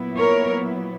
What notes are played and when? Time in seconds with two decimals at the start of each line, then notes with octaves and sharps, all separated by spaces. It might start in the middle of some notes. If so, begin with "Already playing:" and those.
Already playing: A#2 F#3 B3 E4
0.18 A#4 C#5